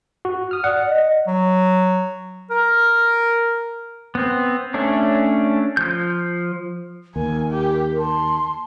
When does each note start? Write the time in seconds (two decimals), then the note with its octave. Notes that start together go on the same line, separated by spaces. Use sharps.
0.25 F#4
0.51 D#6 F6
0.64 D5 F#5
0.89 D#5
1.27 F#3
2.50 A#4
4.15 B3 C4
4.74 A3 C#4 D4
5.77 F3 G6
7.16 D#2 A#4 G#5
7.51 G4
7.99 A5 C6